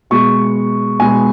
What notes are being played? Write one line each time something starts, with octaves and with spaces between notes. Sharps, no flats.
B2 G#3 B3 C#6
B2 G#3 B3 G#5